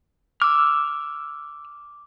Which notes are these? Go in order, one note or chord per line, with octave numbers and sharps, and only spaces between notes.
D6 E6 F6